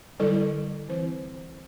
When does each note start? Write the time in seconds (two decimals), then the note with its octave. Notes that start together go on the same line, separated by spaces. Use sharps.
0.19 D3 G3 E4 A4 D5
0.88 E3 C4 E4 C5